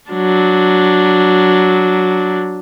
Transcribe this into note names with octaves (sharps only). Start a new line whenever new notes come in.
F#3 D4